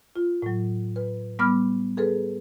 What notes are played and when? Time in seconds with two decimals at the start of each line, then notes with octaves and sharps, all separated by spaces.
0.16 F4
0.42 A2 F#3
0.96 B4
1.39 G3 B3 B5 D6 F6
1.97 G#4 A4 B4